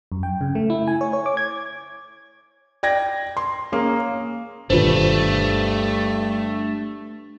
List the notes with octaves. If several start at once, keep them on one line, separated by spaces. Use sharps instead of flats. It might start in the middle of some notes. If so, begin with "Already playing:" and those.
F#2
G5
C#3
A3
E4
G#5
C#5
C#5
D6
G#6
D5 G5 G#6 A#6
C6
A#3 C#4 G#4
G1 G2 B2 D#3 A3 F4 B4 C5